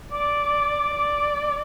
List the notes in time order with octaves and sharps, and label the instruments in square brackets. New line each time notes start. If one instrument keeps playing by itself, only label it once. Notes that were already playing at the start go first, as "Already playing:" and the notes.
[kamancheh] D5 [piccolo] D6
[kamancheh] D5